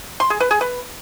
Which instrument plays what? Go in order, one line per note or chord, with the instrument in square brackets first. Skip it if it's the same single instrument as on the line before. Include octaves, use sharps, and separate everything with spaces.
[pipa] C6
G#4
B4
G#4
B4